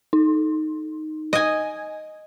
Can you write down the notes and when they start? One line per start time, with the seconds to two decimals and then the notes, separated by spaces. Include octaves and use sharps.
0.13 D#4
1.33 D#5 G#5